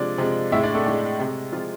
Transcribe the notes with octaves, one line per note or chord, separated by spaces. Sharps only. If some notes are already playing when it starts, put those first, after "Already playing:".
Already playing: C3 F3 G#3 D4 D5
C3 F3 G#3
A2 G#3 E4 E5
D4 D5
A3 A4
A2 G#3
C3 G#3
C3 F3 G#3 F4